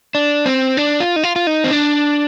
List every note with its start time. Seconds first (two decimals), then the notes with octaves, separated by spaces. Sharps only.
0.15 D4
0.46 C4
0.77 D4
1.00 F4
1.16 D#4
1.23 F4
1.36 F4
1.47 D#4
1.64 C4
1.71 D4